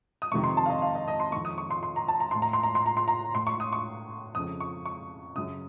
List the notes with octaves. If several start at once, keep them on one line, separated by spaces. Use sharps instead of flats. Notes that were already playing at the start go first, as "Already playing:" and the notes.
D#6
F2 C3 D#3 C#6
C6
A5
F5
D#5
F5
D#5
D#5
C6
F2 D#3 C#6
D#6
C#6
C6
C6
A#5
A5
A#5
A2 C6
A#5
C6
A#5
C6
A#5
C6
A#5
A2 C6
C#6
D#6
C#6
F2 C#3 D#6
C#6
C#6
F#2 C#3 D#6